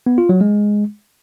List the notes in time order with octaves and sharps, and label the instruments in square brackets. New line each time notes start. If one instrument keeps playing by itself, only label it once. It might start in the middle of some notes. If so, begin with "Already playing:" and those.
[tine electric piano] B3
F4
F#3
G#3